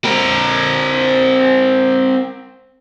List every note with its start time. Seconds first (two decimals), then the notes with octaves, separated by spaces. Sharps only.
0.05 C4 A#4